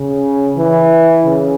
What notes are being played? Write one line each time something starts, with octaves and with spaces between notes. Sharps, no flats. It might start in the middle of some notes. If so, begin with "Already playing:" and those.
Already playing: C#3
E3
C#3